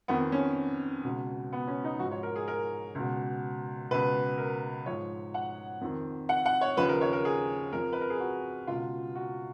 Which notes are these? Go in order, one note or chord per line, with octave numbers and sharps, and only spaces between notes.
F2 D#3 B3
C#4
C#2 B2
B3
C#4
D#4
G#2 F3 F#4
C#5
A#4
G#4
A#4
C#2 B2
C#2 B2 B4
A#4
G#2 F3 C#5
F#5
F2 D#3
F#5
F#5
C#5
D#2 C#3 F3 B4
A#4
C#5
A#4
G#4
F2 F3 A#4
B4
A#4
G#4
F#4
C#2 B2 F4
F#4